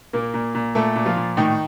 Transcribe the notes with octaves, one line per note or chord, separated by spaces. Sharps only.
A#2 A#3 A#4
A#2
A#2
A#2 A3 A4
A#2
F3 F4
A#2
A2 D#3 D#4